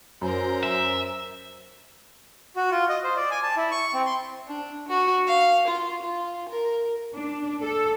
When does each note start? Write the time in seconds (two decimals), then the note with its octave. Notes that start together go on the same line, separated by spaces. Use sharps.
0.21 F#2 A#4 C5
0.63 E5
2.56 F#4
2.71 F4
2.89 D#5
3.04 C5
3.16 D5
3.31 G#5
3.43 A5
3.57 E4
3.71 C#6
3.94 C4
4.06 C6
4.48 D4
4.88 F#4
5.27 F5
5.67 F4
6.02 F4
6.49 A#4
7.15 D4
7.63 A4